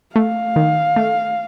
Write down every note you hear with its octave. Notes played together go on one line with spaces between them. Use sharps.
A3 F5
D#3
A3